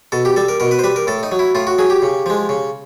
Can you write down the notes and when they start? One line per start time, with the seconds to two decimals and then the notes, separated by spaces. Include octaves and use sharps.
0.12 B2 A4
0.25 G4
0.36 G3 A4
0.48 A#4
0.60 B2 A#4
0.71 B4
0.79 C5
0.84 G3 B4
0.96 A#4
1.07 A2 A4
1.23 D#4
1.32 F#3
1.39 E4
1.55 A2 F4
1.67 F#4
1.78 F#3 G#4
1.90 G4
2.02 C#3
2.26 F3 G#3
2.49 C#3